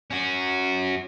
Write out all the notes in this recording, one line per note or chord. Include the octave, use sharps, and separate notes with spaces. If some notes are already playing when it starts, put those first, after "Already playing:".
C#4 F#4